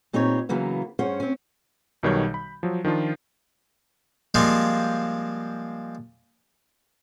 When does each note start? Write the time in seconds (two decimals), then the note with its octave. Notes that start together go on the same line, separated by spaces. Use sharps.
0.13 A#2 C4 D#4 G4 B4 C#5
0.49 C#3 E3 F#3 A#3 B3
0.99 G2 C#4 G#4 C5 F#5
1.20 C4 C#4
2.03 B1 B2 D#3 G3 C#5 G6
2.34 B5
2.63 F3 F#3
2.84 D#3 F3 D4 F4
4.34 F3 G3 G#3 A#3 C4 F4